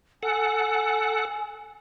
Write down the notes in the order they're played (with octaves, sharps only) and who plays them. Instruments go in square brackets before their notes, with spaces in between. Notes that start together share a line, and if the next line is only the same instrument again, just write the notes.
[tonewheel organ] A4 F#5 [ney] G#5